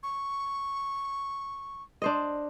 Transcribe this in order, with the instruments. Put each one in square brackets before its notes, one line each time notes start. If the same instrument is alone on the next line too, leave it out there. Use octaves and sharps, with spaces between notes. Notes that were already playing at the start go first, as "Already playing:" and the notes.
[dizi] C#6
[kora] D4 C5 D#5